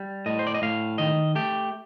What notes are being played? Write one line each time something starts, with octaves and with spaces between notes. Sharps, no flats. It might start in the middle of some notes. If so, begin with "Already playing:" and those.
Already playing: G3
A2 D#5
C5
D5
D#5
A2 F5
D#3 D#5
A3 G4